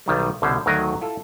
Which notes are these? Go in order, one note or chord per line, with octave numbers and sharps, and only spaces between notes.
B1 D#3 G3
C2 B2 D3 C#4 C5
D2 D#3 F#3 A#4 D#5 F5
E4 F4 A4